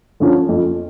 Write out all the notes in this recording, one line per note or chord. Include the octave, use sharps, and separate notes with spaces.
D3 F3 C#4
F2